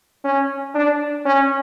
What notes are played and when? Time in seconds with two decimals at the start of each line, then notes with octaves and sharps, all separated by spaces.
0.24 C#4
0.75 D4
1.25 C#4